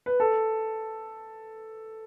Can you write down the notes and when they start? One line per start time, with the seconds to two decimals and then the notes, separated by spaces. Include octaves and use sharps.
0.06 B4
0.20 A4